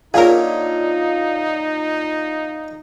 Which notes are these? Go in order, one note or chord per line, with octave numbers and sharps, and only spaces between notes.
A#2 D3 C#4 D#4 G#4 A#4 F5